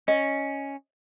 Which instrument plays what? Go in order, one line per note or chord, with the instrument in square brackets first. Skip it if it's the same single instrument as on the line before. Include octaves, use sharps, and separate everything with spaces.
[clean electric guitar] C#4 [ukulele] D#5